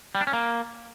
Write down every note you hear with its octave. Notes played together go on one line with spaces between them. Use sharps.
G3
D4
C#4
A#3